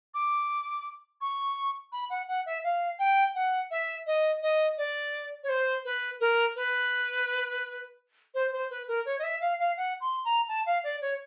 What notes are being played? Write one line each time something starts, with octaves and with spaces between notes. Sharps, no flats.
D6
C#6
B5
F#5
F#5
E5
F5
G5
F#5
E5
D#5
D#5
D5
C#5
C5
B4
A#4
B4
C5
C5
B4
A#4
C#5
D#5
E5
F5
F5
F#5
C6
A#5
A5
F5
D5
C#5